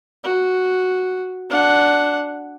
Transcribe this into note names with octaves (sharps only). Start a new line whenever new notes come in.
F#4
D4 F#5